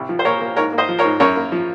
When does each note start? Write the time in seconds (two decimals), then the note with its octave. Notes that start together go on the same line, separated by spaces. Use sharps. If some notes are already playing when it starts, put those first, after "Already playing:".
Already playing: C2
0.09 F3
0.19 C5
0.25 A#2 A#4 C#5
0.40 A#3
0.57 G#2 A#4 C#5
0.73 A#3
0.78 C5 D#5
0.89 F3
0.99 A#4 C#5
1.04 G#2
1.20 F#2 A#4 C#5
1.36 A#3
1.52 F3